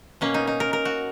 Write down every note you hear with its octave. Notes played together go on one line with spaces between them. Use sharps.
B2 A#3 C#4
D#4
D#4
A#4
A#4
F#4